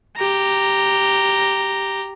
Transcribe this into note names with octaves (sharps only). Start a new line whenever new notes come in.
G4 A#5